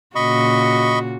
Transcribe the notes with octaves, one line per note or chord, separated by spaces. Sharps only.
A#2 C#3 F#4 D#5 B5 C#6